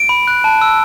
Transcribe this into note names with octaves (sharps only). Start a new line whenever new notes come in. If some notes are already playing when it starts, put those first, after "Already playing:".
Already playing: D7
B5
F#6
A5
E6